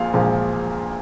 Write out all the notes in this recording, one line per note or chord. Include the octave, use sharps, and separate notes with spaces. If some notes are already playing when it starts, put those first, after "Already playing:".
Already playing: A#1 A#2 F3 G#3 F5
A#1 A#2 F3 G#3